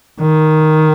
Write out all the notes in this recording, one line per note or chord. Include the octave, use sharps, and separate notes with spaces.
D#3